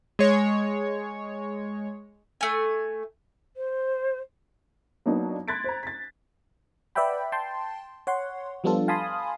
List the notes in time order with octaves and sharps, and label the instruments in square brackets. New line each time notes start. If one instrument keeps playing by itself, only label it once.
[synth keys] G#3 C#5
[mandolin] A3 G#5
[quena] C5
[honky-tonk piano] F#3 A#3 B3 D4 D#4
C6 F#6 G#6 A6 B6 D7
C5 A#5
A6 B6
[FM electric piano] B4 D5 E5 F#5 G5 B5
G5 A5 C6
C#5 F#5 C6
F3 G3 B3 D4 F4 A4
F5 G#5 A5 B5 C6 D#6